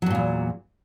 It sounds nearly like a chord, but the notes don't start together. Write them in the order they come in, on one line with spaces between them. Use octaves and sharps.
F#3 G2 A#2 E2